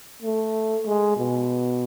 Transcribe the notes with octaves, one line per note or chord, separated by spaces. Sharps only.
A3
G#3
B2